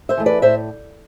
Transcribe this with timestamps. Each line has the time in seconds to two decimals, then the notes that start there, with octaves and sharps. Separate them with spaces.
0.09 C5 E5
0.17 E3 A3
0.26 B4 D5
0.42 A2 C5 E5